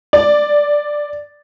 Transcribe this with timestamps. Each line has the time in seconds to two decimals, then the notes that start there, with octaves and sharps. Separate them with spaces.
0.13 D5